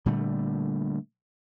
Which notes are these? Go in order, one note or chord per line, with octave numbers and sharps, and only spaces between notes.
A#2 D3 G3 A3